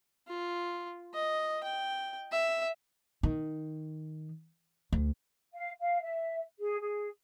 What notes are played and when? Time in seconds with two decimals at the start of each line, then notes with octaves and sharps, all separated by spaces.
0.28 F4
1.14 D#5
1.64 G5
2.31 E5
3.23 D#3
4.93 D2
5.53 F5
5.80 F5
6.01 E5
6.59 G#4
6.80 G#4